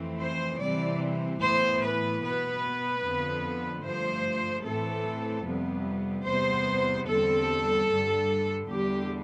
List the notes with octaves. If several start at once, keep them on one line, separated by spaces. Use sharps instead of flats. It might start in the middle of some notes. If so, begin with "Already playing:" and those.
Already playing: F2 E3 A3 C4
C5
C3 E3 G3 C4 D5
A2 E3 B3 C5
B4
B2 B3 B4
F2 D3 F3 B3
G2 F3 A3 C5
A2 E3 A3 C4 A4
F2 C3 G3 B3
E2 C3 G3 B3 C5
E2 D3 G3 C4 A4
G2 D3 G3
E2 D3 G3 G4